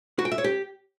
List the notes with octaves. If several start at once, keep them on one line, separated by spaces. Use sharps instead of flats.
F#4
G5
E5
C#5
G4